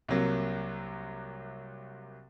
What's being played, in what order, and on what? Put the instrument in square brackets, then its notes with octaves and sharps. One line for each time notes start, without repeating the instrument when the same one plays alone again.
[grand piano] C2 C3 F#3 A#3